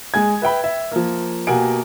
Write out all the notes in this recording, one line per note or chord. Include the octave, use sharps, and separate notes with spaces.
G#3 G#5 G#6
B4 E5 G5 B5
E5
F3 A#3
B2 A#3 G4 F#5 G#5 D7